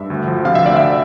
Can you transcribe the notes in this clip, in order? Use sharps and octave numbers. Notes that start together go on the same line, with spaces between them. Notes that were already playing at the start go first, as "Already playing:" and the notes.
Already playing: G2 E5
D2
F3
C3 F5
E5
D2 D5
E5